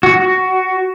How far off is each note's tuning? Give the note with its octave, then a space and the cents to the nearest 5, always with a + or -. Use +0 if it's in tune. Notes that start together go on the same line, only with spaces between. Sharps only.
F#4 +10